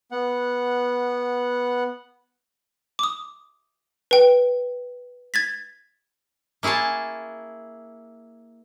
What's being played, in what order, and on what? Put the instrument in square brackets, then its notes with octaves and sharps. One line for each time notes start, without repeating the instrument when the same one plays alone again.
[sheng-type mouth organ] B3 F#5
[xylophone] D6 D#6
B4 G5
G#6 A6 B6
[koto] A#3 E4 G#4 C#5 A5